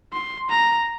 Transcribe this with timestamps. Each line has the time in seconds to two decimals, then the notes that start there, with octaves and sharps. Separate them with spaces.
0.13 C6
0.50 A#5